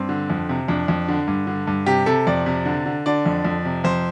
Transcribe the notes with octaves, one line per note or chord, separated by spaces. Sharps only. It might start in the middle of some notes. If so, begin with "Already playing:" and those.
Already playing: G2 C4
D3
F2
C3
F2 D4
F2
D3
G2
D3
G2
C3 G4
C3 A4
F2 D5
C3
D3
D3
D3 D5
F2
F2
C3
F2 C5